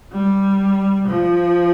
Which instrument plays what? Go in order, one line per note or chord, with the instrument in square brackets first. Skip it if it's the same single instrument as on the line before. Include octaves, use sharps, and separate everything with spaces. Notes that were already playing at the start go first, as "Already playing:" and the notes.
[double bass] G3
F3